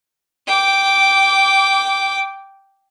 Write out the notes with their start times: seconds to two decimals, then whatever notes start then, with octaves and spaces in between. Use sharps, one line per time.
0.47 G5 D6